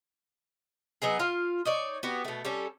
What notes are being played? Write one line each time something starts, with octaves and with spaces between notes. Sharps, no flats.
F#3 B3 D#4 G#4
F4 F5
D#4 C#5 D5
B3 F#4 G4
B2 A3
G3 C#4 A4